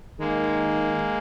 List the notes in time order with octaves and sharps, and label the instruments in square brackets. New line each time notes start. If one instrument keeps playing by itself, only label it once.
[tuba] D#3 [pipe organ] G#3 A#3